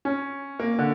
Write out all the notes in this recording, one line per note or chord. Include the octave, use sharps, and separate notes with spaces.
C#4
A#3
D3